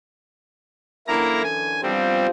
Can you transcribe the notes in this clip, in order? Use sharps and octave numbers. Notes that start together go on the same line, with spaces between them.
F#2 D3 E3 A#3 E4 A#5
G#5
C3 F3 G3 B3 C4